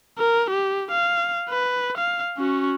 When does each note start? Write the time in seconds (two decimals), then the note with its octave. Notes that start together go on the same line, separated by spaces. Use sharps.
0.18 A#4
0.50 G4
0.91 F5
1.49 B4
1.97 F5
2.38 C#4 F#4